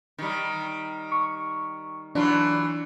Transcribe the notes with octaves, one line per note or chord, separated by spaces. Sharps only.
D#3 G3
C#6
E3 F#3 D4 F4